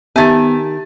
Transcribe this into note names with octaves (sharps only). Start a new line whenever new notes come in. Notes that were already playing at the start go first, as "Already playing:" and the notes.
D#3 B3 G4 E5 G#5 A5 A6